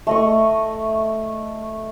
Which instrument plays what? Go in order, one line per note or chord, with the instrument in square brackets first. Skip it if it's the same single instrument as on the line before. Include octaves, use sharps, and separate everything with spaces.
[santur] A3 D#5 C#6